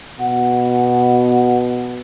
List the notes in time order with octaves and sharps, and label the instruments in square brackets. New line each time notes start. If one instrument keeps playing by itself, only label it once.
[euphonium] B2 [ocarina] F#5